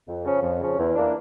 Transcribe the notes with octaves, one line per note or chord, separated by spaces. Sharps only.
F2
C#3 F3 C#4
F2
C#3 F3 C#4
E2
E3 A#3 D4